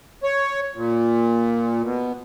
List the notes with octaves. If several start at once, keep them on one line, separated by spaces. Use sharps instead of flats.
C#5
A#2
B2